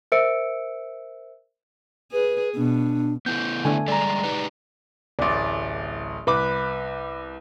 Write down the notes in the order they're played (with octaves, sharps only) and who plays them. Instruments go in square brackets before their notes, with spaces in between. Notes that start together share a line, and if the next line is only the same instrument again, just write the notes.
[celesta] A#4 C5 E5 E6 C#7 D7
[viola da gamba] G#4 [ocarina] B4
[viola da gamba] B2 [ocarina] D4
[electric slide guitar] B3 E4 A4 [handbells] G6
[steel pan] D3 A3 D4 [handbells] G#5
[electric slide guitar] G3 G#3 A4 [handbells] D5 A#5
[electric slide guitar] D#4 G4 B4
[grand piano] D1 A1 [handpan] D5
[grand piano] C2 B5 D6 [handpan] B4